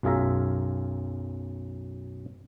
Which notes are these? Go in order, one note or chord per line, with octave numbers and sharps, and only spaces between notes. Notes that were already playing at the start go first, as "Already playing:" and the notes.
B1 F#2 F4 G#4 E5 A#5